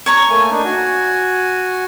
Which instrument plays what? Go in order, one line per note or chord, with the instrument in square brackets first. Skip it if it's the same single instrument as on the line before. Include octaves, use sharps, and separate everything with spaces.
[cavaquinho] C#5 A#5 C#6
[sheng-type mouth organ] A3 A#3 G#5
D4 D#4
F#4 G#5